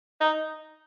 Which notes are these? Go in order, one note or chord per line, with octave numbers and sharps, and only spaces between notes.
D#4